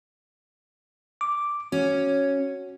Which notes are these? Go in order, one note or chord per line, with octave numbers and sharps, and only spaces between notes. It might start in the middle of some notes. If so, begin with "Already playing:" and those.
D6
C#4 F#4